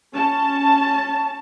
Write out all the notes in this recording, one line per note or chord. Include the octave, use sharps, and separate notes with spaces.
C#4 A5